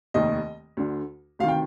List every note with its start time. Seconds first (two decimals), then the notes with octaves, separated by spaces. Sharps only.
0.14 F1 D#2 D#3 D#5
0.77 D2 D3
1.39 D2 C3 D#3 F5
1.48 G5